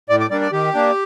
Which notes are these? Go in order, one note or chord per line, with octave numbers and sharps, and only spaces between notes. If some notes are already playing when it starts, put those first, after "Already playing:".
A2 D5
D5
G3 A#3 D4 D5
D5
D#3 G4
A#3 D4